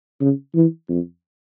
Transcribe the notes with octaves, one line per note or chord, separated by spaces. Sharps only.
C#3
E3
F2